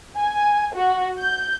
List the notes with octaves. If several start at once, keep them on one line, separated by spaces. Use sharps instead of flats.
G#5
F#4
G6